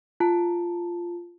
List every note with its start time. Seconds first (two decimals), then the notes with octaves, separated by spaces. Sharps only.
0.20 F4 A5